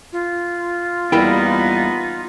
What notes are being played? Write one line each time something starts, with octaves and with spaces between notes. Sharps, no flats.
F4
E2 G3 A#3 B3 D#4 E4 G5